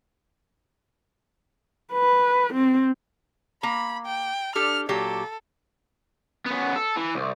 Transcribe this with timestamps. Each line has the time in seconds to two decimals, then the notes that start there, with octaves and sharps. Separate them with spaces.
1.92 B4
2.53 C4
3.63 A#3 A#5 B5
4.06 G5
4.55 D4 G4 A4 F6
4.89 A#2 F#3 G4 A4
6.46 B3 C#4
6.75 A4
6.96 E3
7.15 C2